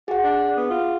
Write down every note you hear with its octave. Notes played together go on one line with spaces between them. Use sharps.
F#4 G#4 F#5
D4
B3
F4